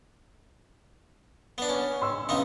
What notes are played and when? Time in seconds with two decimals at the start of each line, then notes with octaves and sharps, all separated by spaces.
1.58 B3 D4
1.69 C#4
2.02 C6 E6
2.29 B3 C#4 D#4 F5 D#6